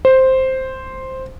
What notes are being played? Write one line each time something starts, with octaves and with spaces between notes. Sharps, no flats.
C5